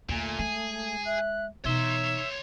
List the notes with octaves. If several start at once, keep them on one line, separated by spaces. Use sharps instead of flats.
D#2 A#2 D3 A3 G#5
G#3 G#4
E5 F#6
B2 E3 D#4 C#5 E5 C6